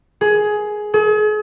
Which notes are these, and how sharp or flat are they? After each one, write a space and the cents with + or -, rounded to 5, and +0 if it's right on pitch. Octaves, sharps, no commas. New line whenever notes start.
G#4 +15
G#4 +40